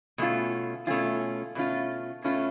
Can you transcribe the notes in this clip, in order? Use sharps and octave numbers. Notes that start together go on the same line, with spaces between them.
B2 A3 C#4 F4
B2 A3 C#4 F4
B2 A3 C#4 F4
B2 A3 C#4 F4